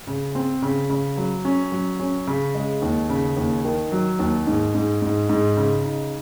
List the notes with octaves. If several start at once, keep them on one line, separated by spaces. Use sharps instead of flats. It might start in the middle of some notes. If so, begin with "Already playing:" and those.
C#3
C4
C#3
C#3
F#3
C#4
F#3
C#4
C#3
G#3
D#2
C#3
D#2
D#3
F#3
D#2
G#2
G#2
G#2
G#2
C#3
D#4